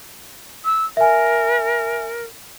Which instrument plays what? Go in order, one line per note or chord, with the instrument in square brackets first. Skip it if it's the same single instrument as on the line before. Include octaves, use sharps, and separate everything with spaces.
[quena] E6
[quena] A#4 [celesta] E5 G#5